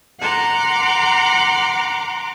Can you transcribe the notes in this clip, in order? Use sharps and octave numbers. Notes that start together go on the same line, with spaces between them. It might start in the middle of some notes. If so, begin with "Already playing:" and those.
F#5 A#5 C6 D6